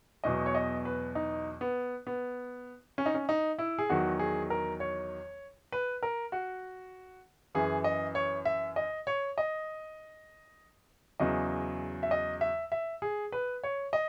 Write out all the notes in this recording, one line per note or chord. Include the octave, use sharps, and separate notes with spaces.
E2 B2 F#3 D#5
C#5
D#5
B4
D#4
B3
B3
C#4
D#4
C#4
D#4
E4
G#4
E2 D#3 F#3 F#4
G#4
A#4
C#5
B4
A#4
F#4
F#2 E3 G#4
D#5
C#5
E5
D#5
C#5
D#5
E2 C#3 F#3 D#5
E5
D#5
E5
E5
G#4
B4
C#5
D#5